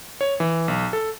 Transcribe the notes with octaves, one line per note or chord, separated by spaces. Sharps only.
C#5
E3
B1
A4